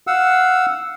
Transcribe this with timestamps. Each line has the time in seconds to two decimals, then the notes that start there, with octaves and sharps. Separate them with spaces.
0.07 F5 F#5 E6